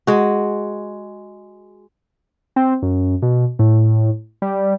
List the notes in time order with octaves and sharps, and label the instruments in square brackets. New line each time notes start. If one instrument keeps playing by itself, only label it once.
[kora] G#3 F#4
[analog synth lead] C4
F#2
B2
A2
G3